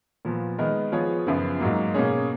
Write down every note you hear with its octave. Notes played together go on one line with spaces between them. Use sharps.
A#2 F3 B3
D#3 G#3 B3 D#4 A#4
F3 B3 F4 G#4 C#5
F#2 C#3 F3 B3 F4
G#2 F#3 A#3
B2 A#3 C#4 G#4 C#5